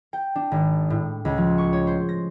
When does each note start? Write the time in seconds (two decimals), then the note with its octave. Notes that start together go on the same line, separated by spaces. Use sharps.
0.13 G5
0.35 D4
0.51 G#1
0.90 A2
1.25 C#2
1.38 F3
1.58 C#6
1.73 C#5
1.87 C5
2.09 A#6